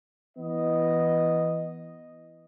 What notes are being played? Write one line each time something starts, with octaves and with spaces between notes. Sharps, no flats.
E3 B3 D#5